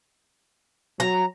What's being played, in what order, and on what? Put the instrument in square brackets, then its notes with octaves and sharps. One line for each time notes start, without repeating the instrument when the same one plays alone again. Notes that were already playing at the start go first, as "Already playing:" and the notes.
[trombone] F#3 [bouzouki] A#5